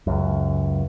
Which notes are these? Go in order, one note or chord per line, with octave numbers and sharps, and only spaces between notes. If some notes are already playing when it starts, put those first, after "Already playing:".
C#2 F#2